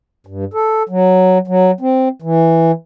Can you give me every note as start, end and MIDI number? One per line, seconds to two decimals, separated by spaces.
0.27 0.45 43
0.54 0.83 69
0.89 1.38 54
1.48 1.71 54
1.81 2.09 60
2.22 2.72 52